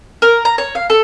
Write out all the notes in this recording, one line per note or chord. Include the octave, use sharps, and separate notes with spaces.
A#4
A#5
C#5
F5
A4